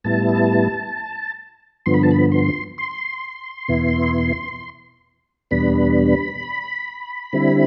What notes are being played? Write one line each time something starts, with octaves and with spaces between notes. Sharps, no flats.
A2 G3 B3 E4 A5
G2 D3 F3 B3 C6
B5
A5
B5
C6
C6
E2 B2 B3 E4
E2 B2 G3 B3 D4 B5
D3 G3 C4 E4